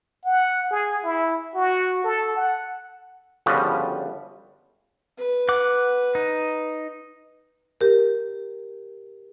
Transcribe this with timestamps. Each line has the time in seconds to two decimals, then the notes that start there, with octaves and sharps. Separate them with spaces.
0.25 F#5
0.71 G#4
1.04 E4
1.55 F#4
2.04 A4
2.37 F#5
3.46 G1 C#3 F3 G3 F#4 B4
5.18 B4
5.49 F#5 D6
6.15 D#4
7.81 G4 A#4